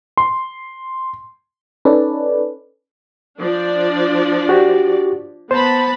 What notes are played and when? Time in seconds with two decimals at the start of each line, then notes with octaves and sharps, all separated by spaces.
0.17 C6
1.85 C#4 D#4 A4 B4 D5
3.39 F3 D4 D5
4.49 F#4 G4
5.51 B3 C5 A5 B5